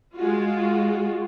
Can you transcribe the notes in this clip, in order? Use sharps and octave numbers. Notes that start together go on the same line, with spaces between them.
G#3 F4 F#4